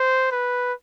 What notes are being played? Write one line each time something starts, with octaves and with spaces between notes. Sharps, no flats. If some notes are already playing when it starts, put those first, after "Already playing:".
Already playing: C5
B4